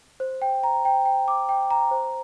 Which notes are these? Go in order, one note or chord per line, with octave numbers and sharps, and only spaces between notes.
C5
G5
A#5
G5
G5
D6
G5
A#5
C5